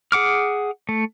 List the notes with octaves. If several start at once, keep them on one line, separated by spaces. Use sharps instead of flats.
G#4 F#5 D6 F6
A3